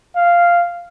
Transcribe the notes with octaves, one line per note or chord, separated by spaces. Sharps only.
F5